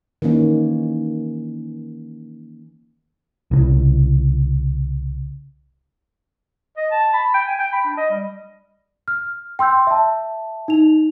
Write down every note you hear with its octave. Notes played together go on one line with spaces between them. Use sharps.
D#3 E3 A#3 C#4
C2 C#3
D#5
A5
B5
G5
G#5
G5
B5
D4
D#5
G3
F6
G5 C6 E6 G6
E5 A5
D#4 F7